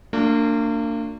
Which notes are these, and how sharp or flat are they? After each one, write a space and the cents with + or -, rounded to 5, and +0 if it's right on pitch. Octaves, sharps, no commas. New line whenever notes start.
A#3 -35 D4 +0 F4 +45